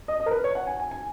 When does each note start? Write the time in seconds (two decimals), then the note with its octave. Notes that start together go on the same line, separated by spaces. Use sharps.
0.08 D#5
0.20 D#5
0.26 A#4
0.31 B4
0.44 C#5
0.55 F#5
0.67 G#5
0.80 G#5
0.91 G#5